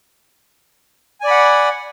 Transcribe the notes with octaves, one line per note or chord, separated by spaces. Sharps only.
D5 F#5 G#5 B5